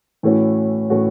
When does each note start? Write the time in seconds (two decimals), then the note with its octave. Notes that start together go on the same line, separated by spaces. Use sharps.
0.23 A2 E3 A3 C#4 F#4
0.90 A2 E3 A3 C#4 F#4